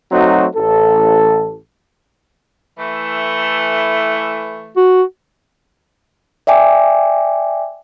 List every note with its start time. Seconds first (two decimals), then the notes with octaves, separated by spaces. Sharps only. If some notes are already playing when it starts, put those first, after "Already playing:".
0.11 F#3 A3 C4 D#4 F#4
0.55 A1 A4
2.77 E3 A3
4.77 F#4
6.47 D5 E5 G5 G#5 D6